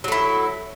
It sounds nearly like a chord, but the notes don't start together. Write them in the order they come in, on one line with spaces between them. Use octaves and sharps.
F#3 A4 E4